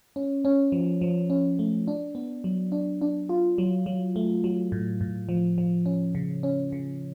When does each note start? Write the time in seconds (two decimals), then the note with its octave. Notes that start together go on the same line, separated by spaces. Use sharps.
0.16 C#4
0.45 C#4
0.72 F3
1.01 F3
1.30 C#4
1.59 A3
1.88 D4
2.15 B3
2.44 F#3
2.72 D4
3.01 D4
3.29 F4
3.58 F#3
3.86 F#3
4.16 A3
4.44 F#3
4.72 A2
5.01 A2
5.29 F3
5.58 F3
5.86 C#4
6.15 C#3
6.43 C#4
6.72 C#3